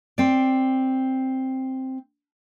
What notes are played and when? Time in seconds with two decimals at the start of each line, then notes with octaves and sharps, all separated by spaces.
0.18 C4 D5